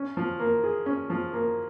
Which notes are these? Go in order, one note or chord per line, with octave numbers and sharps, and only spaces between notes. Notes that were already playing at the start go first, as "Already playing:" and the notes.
Already playing: C#4
F3
A#3
G#4
C#4
F3
A#3